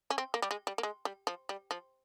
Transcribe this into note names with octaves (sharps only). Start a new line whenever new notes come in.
C#4
C4
A#3
G3
G#3
G3
A#3
G#3
G3
F3
G3
F3